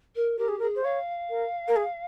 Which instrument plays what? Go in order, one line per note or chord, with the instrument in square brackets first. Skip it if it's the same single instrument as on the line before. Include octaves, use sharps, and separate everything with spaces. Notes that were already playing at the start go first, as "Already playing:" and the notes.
[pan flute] A#4
[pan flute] G4 [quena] A#4
[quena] G#4
A#4
[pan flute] G#4
[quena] C5
[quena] C#5 [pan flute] F5
[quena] A#4
A#4
G#4